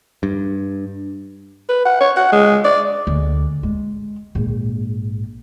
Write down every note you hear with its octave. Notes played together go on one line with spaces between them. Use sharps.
G2
B4
F#5
C#5
F#5
G#3
D5
D2
G#3
A#1 G#2